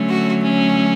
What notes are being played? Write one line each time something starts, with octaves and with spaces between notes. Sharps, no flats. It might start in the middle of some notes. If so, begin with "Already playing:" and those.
Already playing: D3 F#3 A3 C#4
F#4
C#4